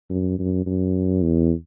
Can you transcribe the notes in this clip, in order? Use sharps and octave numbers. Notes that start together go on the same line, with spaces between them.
F#2
F#2
F#2
E2